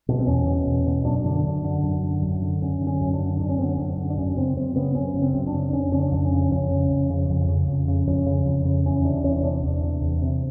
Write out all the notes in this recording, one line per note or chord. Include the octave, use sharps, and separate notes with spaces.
B2
C4
E2 C#4
B2
E2
B2
F#2 D4
D3 D4
F#2
D3
F#2
D3
F#2
D3
F#2 C#4
D3
C#4
F#2
D4
D3
F#2 D4
C#4
D3 C4
C#4
F#2 D4
D3
D4
F#2 C#4
C#3 C4
F#2 C4
C#3 B3
F#2 C#4
C#3
C4
F#2
D4
C#3
F2 C#4
C#3 C#4
D4
F2
C#4
C#3
F2 C#4
C#3
F2
C#3
F2
C#3
F2
C#3
F2 C#4
C#3
F2
C#3
E2 C#4
C3 D4
E2 C#4
C#4
C3 D4
E2
C3
E2
C3